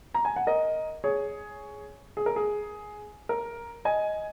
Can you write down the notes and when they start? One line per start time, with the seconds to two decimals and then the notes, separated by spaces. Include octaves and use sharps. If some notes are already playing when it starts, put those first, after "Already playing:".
0.14 A#5
0.25 G#5
0.36 F#5
0.47 A#4 D#5
1.04 G#4 C#5
2.17 G#4
2.26 A#4
2.36 G#4
3.29 A#4
3.85 D#5 G#5